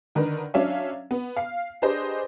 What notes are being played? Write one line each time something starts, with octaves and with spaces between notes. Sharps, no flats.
D3 D#3 A#4 B4 D5
F#3 C#4 D4 C#5 E5 F5
B3
F5 C7
D4 G4 G#4 B4 C5 D#5